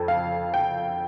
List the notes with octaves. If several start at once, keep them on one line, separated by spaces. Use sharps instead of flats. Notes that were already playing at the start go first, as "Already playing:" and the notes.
Already playing: F2 A4
F5
G5